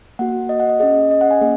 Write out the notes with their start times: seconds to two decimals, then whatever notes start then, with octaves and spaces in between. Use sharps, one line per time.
0.19 A#3 F#4 F#5
0.49 D#5
0.60 F#5
0.69 D#5
0.79 C#4 G#4 D#5
1.11 D#5
1.21 F#5
1.31 G#5
1.41 A#3 C#4 G#4